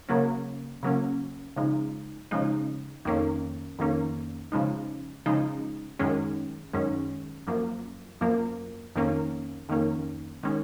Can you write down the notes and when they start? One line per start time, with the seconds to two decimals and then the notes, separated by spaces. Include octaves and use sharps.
0.09 C#3 F#3 A#3 C#4
0.83 C#3 F#3 A#3 C#4
1.56 C#3 F3 G#3 D#4
2.31 C#3 F3 G#3 D#4
3.05 F2 D#3 A#3 C#4
3.79 F2 D#3 A#3 C#4
4.52 C#3 F3 G#3 D#4
5.26 C#3 F3 G#3 D#4
5.99 F#2 D#3 G#3 C#4
6.73 F#2 D#3 G#3 C#4
7.47 F#2 F3 A#3
8.21 F#2 F3 A#3
8.95 F2 D#3 A#3 C#4
9.69 F2 D#3 A#3 C#4
10.43 D#3 G#3 C#4